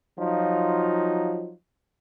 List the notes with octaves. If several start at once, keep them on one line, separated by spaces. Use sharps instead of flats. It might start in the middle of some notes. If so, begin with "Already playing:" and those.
F3 F#3 D#4 F4